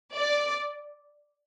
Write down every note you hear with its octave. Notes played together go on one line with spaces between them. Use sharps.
D5